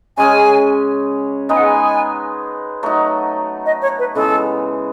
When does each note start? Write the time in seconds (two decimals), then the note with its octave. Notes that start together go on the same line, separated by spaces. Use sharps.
0.17 C#3 G#3 C#4 G#4 G#5
1.49 G#3 B3 D#4 G#5
1.57 F#5
1.64 G#5
2.83 F#3 A3 D#4 F#4
3.66 D#5
3.82 C#5
3.99 B4
4.15 C#3 E3 G#3 B3 A4